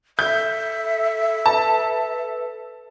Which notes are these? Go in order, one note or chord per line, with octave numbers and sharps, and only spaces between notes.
A4 E5 G6
B4 A5